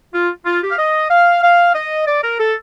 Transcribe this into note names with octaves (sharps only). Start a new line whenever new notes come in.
F4
F4
G4
F5
D#5
F5
F5
D#5
D5
A#4
A4